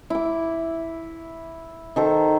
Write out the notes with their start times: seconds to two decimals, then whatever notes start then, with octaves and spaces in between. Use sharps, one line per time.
0.10 E4 D6
1.96 D#3 A4 C5 A#5